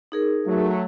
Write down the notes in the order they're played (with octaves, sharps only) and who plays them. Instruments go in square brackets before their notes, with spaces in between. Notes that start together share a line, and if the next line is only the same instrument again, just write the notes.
[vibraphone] D#4 G#4 A#4
[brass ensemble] F#3 A3